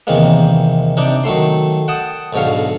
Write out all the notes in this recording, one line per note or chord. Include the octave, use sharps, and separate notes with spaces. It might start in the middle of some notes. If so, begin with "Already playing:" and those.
E2 C3 D#3 E3 G#3 A#3
C3 D4 D#4 G5 D6
D#3 F#3 A3 C6
F#5 G5 A5 D#6
B1 G#2 D3 C#5 F5